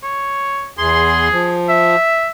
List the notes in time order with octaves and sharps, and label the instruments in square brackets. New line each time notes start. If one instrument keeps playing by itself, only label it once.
[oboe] C#5
[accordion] E2 C6 [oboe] G#4
[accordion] F3
[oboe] E5